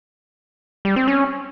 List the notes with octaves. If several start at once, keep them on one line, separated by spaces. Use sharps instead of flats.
G3
C4
C#4